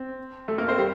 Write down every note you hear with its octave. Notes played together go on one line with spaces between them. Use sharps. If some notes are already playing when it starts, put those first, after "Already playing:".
Already playing: C4
A3 A4
A#3 A#4
C4 C5
G3 G4